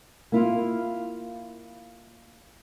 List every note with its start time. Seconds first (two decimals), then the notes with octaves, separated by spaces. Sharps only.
0.32 A#3 E4 F4